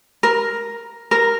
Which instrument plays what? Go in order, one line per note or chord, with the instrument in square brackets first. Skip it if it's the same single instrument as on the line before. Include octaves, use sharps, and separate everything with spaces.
[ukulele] A#4
A#4